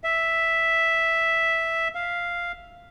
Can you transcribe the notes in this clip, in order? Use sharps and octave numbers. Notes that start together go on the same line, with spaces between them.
E5
F5